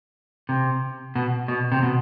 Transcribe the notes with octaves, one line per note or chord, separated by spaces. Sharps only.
C3
B2
B2
C3
B2